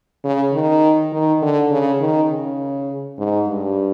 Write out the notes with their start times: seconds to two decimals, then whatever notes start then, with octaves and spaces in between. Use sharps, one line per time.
0.24 C#3
0.53 D#3
1.12 D#3
1.42 D3
1.71 C#3
2.00 D#3
2.30 C#3
3.18 G#2
3.48 G2